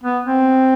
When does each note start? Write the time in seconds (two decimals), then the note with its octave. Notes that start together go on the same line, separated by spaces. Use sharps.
0.03 B3
0.26 C4